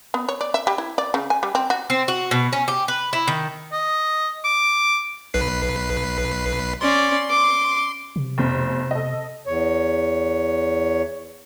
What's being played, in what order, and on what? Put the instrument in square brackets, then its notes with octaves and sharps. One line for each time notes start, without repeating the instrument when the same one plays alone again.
[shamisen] B3
C#5
D5
E5
G3
E4
D5
C#3
G#5
G3
C4
F#4
[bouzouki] C4
F#4
B2
C#4
G4
B4
E4
D#3
[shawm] D#5
D6
[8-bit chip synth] B1 B4 C7
[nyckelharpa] C#4 D5 [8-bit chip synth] C6
[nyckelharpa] D6
[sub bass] C3
[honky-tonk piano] F1 B2 C5
A4 D#5
[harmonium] E2 C#5